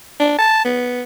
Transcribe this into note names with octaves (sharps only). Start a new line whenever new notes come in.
D4
A5
B3